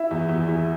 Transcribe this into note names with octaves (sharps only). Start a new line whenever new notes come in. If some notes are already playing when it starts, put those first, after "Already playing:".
Already playing: E4 E5
E2
E2
E2